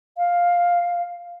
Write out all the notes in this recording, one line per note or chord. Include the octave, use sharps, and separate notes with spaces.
F5